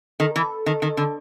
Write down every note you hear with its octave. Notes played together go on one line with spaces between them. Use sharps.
D#3 A4
E3 A#4
A4
D#3
D#3
D3